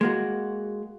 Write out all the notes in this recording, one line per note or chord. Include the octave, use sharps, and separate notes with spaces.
G#3 A#3 F#4